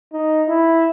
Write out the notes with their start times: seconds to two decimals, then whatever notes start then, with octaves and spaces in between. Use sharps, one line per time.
0.13 D#4
0.48 E4